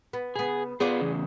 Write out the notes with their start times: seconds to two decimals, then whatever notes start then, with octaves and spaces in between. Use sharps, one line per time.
0.13 B3
0.36 C#3 B3 G#4
0.80 B3 F4 G#4 C5 D5
1.01 E2 C#3